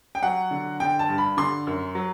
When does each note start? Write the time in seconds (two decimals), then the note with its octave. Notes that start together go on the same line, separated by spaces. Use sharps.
0.15 G5
0.23 F#3 F#5
0.51 D3
0.80 D3 G5
0.99 A5
1.09 G2
1.18 B5
1.37 D3 C6
1.67 F#2
1.95 F#3